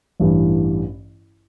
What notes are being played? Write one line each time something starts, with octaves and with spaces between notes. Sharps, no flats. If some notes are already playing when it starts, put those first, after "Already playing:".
A1 G2 E3